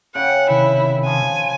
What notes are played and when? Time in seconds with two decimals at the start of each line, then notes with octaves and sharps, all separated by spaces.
0.15 C#3 F#5 G5
0.50 C3 D#3 E4
1.06 F3 G#5